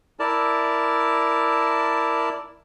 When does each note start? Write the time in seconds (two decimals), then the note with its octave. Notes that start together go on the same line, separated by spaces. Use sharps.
0.20 E4 A#4 D5 A5